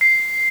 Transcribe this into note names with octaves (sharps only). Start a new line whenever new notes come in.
C7